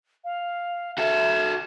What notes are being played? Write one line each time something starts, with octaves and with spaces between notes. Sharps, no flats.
F5
F#4 A4 E5 E7